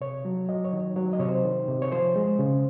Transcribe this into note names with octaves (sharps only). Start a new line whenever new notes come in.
C3 C#5
F#3
F#3 D#5
C#5
D#3
F#3 C#5
D#5
C3 C#5
C5
D#3
C3
C#5
F3 C5
G#3
C#3